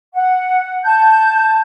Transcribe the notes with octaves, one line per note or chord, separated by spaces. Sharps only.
F#5
A5 G6